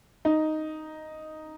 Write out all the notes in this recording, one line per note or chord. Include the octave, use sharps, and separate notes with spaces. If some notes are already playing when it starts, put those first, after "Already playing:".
D#4